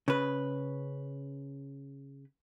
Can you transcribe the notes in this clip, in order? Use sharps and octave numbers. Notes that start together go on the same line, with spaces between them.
C#3 B4